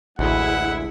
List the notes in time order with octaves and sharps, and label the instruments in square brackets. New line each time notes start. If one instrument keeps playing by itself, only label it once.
[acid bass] A1 [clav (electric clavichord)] D2 [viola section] G#3 E4 E5 [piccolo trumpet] F#5